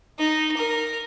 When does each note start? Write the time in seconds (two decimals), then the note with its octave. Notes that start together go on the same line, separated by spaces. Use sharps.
0.19 D#4
0.57 A#4